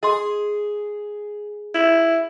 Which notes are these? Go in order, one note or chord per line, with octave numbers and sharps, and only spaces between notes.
G#4 D#5 C6
E4